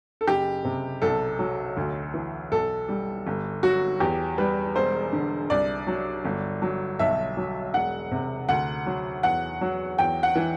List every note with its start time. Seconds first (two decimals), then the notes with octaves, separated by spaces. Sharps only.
0.21 A4
0.27 F#1 G4
0.65 C3
1.02 B1 A4
1.39 F#3
1.77 D2
2.14 E3
2.52 B1 A4
2.88 G3
3.27 G1
3.63 F#3 F#4
4.00 E2 G4
4.38 G3 B4
4.76 E1 C5
5.13 D3
5.50 C2 D5
5.87 F#3
6.25 G1
6.62 F#3
6.99 B1 E5
7.37 F#3
7.74 E1 F#5
8.12 C3
8.49 D2 F#5
8.86 F#3
9.23 E2 F#5
9.61 F#3
9.98 E2 G5
10.23 F#5
10.35 E3